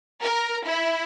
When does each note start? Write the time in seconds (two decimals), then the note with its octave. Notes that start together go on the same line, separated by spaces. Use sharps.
0.22 A#4
0.67 E4